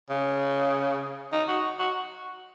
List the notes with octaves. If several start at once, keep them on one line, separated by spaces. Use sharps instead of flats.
C#3
D#4
F#4
F#4